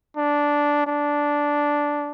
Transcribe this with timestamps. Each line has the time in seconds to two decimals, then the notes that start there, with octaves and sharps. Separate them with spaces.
0.17 D4
0.87 D4